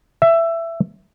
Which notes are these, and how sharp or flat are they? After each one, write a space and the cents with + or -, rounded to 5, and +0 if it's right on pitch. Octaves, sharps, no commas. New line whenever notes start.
E5 +15